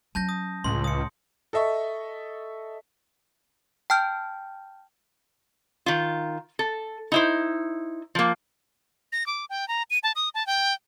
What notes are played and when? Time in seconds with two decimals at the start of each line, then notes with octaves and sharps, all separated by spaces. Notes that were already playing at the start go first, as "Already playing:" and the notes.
0.15 F#3 C#4 A5 G6 A#6
0.29 D#6
0.64 C#2 A2 C6
0.84 D#6 C#7
1.53 A4 D#5 E5 C#6
3.90 G5 A5 F6 G6
5.86 D#3 F4
6.59 A4
7.12 D#4 E4 C5
8.15 F3 A#3
9.12 A#6
9.26 D6
9.50 G5
9.68 A#5
9.90 D#7
10.03 A5
10.16 D#6
10.35 A5
10.47 G5